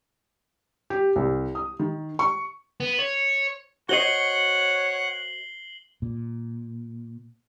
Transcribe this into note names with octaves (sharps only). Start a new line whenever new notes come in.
G4
C2
D#6
D#3
C#6
B3
C#5
F#4 C5 C#5 D#5 F#5 C7 F#7 G7
A#2